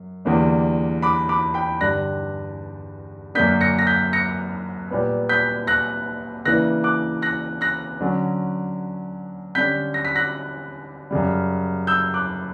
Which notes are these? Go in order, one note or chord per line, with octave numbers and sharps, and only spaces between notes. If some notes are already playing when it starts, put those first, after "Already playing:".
Already playing: F#2
E2 D3 G3 A#3 D4
B5 D6
B5 D6
G5 B5
G2 D3 G3 F#6 A#6
F#2 D3 A#3 D4 G6 B6
A#6 C#7
A#6
G6 B6
A#6 C#7
A#2 G3 B3
G6 B6
F#6 A#6
C#3 E3 A#3 D4 F#6 A#6
D6 F#6
F#6 A#6
F#6 A#6
D3 F#3 C#4
D3 G3 C#4 G6 B6
A#6
B6
F#6 A#6
F#2 C#3 G3
E6 G6
D6 F#6